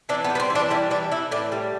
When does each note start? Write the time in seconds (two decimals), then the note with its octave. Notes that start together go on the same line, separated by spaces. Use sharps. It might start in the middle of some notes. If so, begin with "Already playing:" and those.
0.09 E3 D4
0.24 B3
0.30 G3
0.35 B3
0.40 C4
0.50 E3
0.55 D4
0.70 G3 E4
0.91 E3 D4
1.11 E3 E4
1.31 A2 D4
1.52 G3